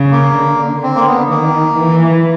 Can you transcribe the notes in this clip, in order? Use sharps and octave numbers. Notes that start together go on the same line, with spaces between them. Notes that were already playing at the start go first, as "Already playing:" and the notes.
Already playing: C#3
A#3
D3
C4
A#3
B3
D#3 A#3
E3